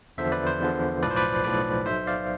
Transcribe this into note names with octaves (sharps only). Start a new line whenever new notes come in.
E2 D3 F3 C5 E5
B4 D5
C5
E2 D3 F3
B1 A2 F3 B4 D5
C5
B4 D5
B1 A2 F3 B4 D5
B1 B2 C5 E5
D5 F5